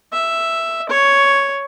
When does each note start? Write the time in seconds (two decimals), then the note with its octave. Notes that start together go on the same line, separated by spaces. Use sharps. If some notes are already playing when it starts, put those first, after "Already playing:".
0.13 E5
0.89 C#5